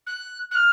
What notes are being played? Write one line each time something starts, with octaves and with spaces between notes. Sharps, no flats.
F#6
F#6
F6